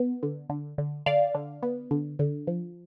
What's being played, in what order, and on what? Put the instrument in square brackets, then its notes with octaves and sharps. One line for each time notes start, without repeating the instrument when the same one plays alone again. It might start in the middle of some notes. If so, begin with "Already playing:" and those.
Already playing: [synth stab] B3
D3
D3
D3
D3 D5 F5
D3
B3
D3
D3
F3